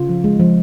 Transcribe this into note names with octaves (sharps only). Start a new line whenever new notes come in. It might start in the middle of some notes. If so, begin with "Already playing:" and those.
Already playing: C#3 F4
F3
G#3
F3